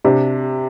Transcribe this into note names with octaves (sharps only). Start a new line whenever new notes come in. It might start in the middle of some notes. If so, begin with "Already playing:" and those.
C3 D4